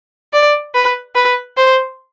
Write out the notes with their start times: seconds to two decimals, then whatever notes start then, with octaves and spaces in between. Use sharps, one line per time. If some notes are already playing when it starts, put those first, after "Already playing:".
0.34 D5
0.74 B4
1.15 B4
1.57 C5